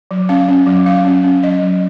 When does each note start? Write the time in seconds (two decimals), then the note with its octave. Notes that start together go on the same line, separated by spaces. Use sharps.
0.11 F#3
0.29 C#4 F5
0.48 C#4
0.67 F#3
0.86 F#3 F5
1.05 C#4
1.24 C#4
1.43 F#3 D#5
1.62 F#3